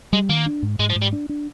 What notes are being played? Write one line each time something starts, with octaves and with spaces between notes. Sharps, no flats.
G3 G#3
D#3 A#3
D4
G#2
G#2 G#3
F3
G#2
G3
D4
D4